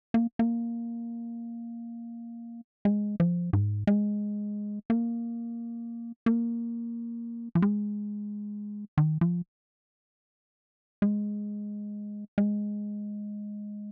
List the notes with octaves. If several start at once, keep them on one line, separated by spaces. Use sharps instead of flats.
A#3
A#3
G#3
F3
G#2
G#3
A#3
A#3
F3
G#3
D#3
F3
G#3
G#3